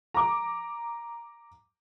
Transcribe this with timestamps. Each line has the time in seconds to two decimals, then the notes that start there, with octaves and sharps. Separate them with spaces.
0.14 A#5 D6